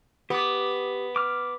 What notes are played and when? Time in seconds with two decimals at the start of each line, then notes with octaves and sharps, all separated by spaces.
0.30 B3 G4 D6
1.16 D6 F6